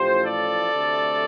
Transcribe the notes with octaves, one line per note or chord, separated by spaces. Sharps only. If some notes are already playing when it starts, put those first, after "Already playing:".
Already playing: A1 A2 F3 G4 C5
A4 D5
D2 C3 A3